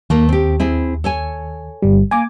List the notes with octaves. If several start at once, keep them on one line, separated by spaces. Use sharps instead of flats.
D#2 A3 A#3
C4 G4
C4 E4 G#4
A4 C#5 G#5
G1 G3
A#3 G#5 D6